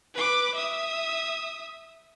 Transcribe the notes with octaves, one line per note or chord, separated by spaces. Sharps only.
B4 D6
E5 D#6